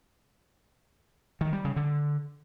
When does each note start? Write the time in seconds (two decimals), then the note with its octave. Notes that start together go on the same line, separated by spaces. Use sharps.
1.41 D#3
1.53 G3
1.65 C#3
1.76 D3